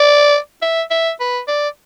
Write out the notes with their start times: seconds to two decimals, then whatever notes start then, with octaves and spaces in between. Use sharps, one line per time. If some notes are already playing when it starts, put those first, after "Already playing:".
Already playing: D5
0.62 E5
0.91 E5
1.20 B4
1.48 D5